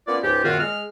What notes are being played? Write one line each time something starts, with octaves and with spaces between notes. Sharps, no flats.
A#3 B3 C#4 F4 D5
C#2 G#2 F4 G4
F#2 A#2 D#3 B3 F4 F#4
G#3 F6